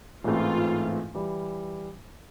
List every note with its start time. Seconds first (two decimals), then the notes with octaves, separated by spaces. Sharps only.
0.24 A1 G#2 E3 A3 C4 F4
1.14 E3 G3